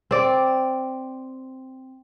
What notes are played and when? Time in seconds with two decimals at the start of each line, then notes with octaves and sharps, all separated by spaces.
0.11 C4 D5